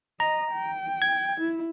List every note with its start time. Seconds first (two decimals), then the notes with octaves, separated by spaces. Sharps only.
0.20 D#5 A#5
0.52 G5
1.02 G#6
1.40 E4